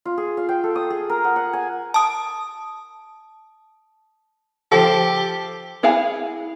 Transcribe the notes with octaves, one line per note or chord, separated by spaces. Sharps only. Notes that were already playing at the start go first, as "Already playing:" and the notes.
F4
G#4
F5
G5
A4
D#6
G#4
A#4
F#5
F#5
G#5
A5 D#6
F3 G4 A4
E4 G#4 F5 F#5 G#5